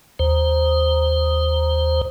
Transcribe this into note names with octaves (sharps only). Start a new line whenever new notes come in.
D#2 C5